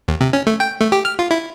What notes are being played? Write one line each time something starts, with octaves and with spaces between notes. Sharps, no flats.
D#2
C3
C#4
A3
G5
A3
G4
F6
F4
E4